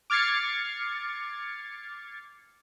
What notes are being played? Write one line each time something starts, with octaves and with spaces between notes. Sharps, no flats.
D6 F6 G#6 A6 C7 C#7